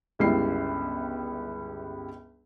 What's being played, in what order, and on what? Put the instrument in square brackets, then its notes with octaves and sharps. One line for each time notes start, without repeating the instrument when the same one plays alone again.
[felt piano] G1 C#2 G3 E4 C7